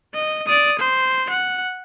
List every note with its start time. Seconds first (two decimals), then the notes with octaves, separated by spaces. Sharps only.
0.14 D#5
0.47 D5 D#6
0.79 C5
1.30 F#5